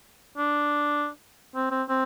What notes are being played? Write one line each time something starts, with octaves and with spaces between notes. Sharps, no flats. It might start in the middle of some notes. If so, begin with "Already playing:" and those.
D4
C4
C4
C4